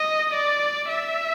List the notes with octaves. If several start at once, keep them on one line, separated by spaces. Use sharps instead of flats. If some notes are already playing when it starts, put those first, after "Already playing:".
Already playing: D#5
D5
E5